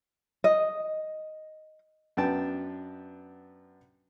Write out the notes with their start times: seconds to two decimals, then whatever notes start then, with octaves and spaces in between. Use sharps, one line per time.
0.44 D#5
2.17 F#2 B3 D4 G5 A5